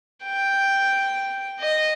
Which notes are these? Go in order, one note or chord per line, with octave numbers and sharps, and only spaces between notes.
G5
D#5